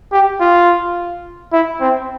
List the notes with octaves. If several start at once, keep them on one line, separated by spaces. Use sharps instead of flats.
G4
F4
E4
C4